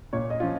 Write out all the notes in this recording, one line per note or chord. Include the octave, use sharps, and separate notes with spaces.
A#2 C#5
D#5
F3 C#4 F4